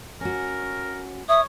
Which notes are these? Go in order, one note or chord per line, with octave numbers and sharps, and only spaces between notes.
C#4 F#4 A#4
C#5 E5 D#6